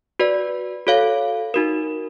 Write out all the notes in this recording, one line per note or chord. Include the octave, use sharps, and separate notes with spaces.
F#4 B4 D5
F#4 A4 C#5 F5
D#4 F#4 A#4